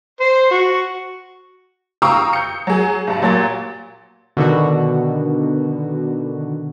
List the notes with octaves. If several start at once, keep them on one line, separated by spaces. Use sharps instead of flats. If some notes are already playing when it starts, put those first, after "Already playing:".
C5
F#4
F5 G5 A#5 C#6 D#6 E6
G6 C#7
F#3 G#4
B1 G2 A5
A#2 F#3 A#4 G#6 A6
B2 D3 D#3 F#4